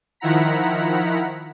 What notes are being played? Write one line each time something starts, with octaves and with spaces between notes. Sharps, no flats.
D#3 F3 E4 F#5 A#5 B6